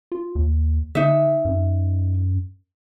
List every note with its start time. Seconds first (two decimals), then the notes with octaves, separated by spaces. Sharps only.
0.12 F4
0.35 D#2
0.95 D3 D#4 E5
1.45 F#2